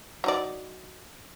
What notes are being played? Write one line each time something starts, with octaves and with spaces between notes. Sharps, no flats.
F#3 D#4 D5